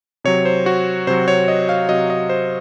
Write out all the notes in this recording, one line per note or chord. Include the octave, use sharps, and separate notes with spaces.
C3 F#3 C#5
C5
F#4
C3 F#3 C5
C#5
D#5
F5
C3 F#3 D#5
D#5
C5